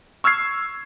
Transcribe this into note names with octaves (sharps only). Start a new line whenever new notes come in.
C#6 E6 F6 G#6 C7